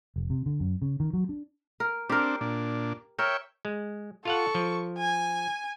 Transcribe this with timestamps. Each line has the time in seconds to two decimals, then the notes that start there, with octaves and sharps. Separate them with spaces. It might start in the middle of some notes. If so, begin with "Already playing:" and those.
0.16 F1
0.30 C3
0.46 D3
0.60 F#2
0.82 C#3
1.00 D#3
1.13 F#3
1.29 D4
1.80 A#4
2.10 C4 D4 G4 A#4
2.41 A#2 D4
3.19 A#4 C#5 E5 G5
3.65 G#3
4.25 F4 A4 F5 F#5 C#6
4.55 F3
4.98 G#5